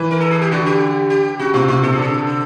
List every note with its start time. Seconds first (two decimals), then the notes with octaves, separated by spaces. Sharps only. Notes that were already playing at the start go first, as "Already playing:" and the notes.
Already playing: E3
0.11 A#4
0.20 A4
0.31 G#4
0.42 G4
0.51 D3 F#4
0.66 G4
1.10 G4
1.39 C#3 F#4
1.54 C3 F4
1.68 C3 F4
1.83 C3 A4
1.93 G#4
1.98 D3 A4
2.27 A4